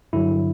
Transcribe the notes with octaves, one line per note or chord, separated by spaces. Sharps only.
G2 D3 F#3 E4